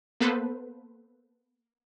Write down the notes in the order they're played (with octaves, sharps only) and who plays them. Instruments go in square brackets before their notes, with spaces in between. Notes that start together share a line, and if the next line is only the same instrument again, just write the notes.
[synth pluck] A#3 B3 A4 B4 C5